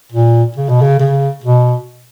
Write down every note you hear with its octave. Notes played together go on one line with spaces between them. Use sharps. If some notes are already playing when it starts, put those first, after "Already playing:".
A#2
C#3
B2
C#3
C#3
B2